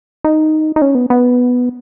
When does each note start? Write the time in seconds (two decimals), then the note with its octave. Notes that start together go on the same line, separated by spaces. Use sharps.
0.24 D#4
0.76 D#4
0.82 C#4
0.95 B3
1.10 B3